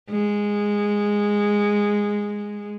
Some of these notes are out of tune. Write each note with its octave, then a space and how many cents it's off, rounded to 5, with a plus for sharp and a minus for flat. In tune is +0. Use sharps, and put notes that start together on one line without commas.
G#3 -10